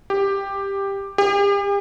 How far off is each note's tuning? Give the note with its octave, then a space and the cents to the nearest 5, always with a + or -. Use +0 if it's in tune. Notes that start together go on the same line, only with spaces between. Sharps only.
G4 +10
G4 +45